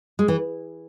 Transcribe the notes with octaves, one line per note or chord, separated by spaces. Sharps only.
G#3
E3